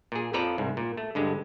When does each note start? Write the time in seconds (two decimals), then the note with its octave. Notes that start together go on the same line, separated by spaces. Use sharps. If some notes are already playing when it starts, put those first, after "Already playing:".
0.12 A#2 G#4
0.33 F2 F3 A4 B4 D5 A#5
0.58 C2 G#2
0.77 A#2
0.97 A3
1.15 G2 D3 G#3